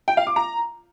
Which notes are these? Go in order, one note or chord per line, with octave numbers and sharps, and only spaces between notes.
G5
F5
D6
A#5